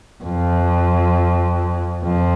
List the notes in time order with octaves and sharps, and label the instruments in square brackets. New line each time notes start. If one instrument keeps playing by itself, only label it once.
[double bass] F2
F2